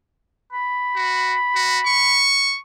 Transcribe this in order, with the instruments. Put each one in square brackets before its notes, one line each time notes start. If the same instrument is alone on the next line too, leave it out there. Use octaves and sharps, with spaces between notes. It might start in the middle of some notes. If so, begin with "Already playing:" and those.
[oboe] B5
[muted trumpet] F#4
F#4
C#6